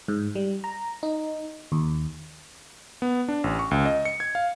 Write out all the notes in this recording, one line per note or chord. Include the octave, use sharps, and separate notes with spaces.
G#2
G3
A#5
D#4
D#2
B3
D4
A1
C#6
C#2
D#5
C#7
G#6
F5